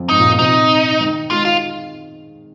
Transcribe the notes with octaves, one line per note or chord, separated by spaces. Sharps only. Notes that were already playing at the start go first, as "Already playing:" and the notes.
Already playing: F2
G#2 D#4
A#2
A#2
C3 D#4
D#3
G#3 F4
F4